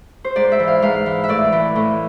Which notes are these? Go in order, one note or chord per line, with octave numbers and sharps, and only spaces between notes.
C5
G#2 D5
E5
E3
F5
G#2 F5
E3
E5
A2 D5
E3
A2